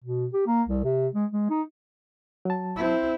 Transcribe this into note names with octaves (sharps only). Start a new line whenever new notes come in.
B2
G4
A#3
C2
C3
G#3
G#3
D#4
F#3 A5
C4 E4